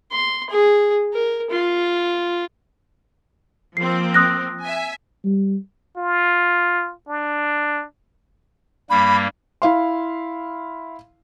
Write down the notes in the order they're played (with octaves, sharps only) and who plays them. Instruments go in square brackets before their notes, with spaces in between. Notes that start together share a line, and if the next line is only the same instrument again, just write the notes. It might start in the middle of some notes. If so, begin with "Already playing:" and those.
[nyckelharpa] C6
G#4
A#4
F4
[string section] F3 A#3 C4 [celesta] C7
[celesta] D#6 F#6 A#6
[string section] E5 G#5
[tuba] G3
[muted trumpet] F4
D4
[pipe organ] G2 G3 A#3 [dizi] B5
[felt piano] E4 F5 C6